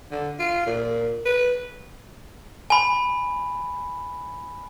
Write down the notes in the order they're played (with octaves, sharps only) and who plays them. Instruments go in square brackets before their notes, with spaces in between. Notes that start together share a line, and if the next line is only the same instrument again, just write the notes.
[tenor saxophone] D3
F4
A#2
B4
[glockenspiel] G#5 B5